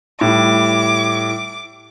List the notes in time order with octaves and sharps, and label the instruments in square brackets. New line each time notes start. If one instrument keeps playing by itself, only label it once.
[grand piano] A2 G3 [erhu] D6